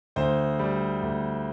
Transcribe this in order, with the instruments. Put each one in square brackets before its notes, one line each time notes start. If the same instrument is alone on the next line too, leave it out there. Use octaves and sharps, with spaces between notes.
[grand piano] D2 C5
G3
D2